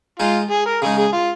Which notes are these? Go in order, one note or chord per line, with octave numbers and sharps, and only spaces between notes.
G#3 D#4 F4 G#4
G#4
A#4
C#3 G#3 D#4 G#4
G#4
F4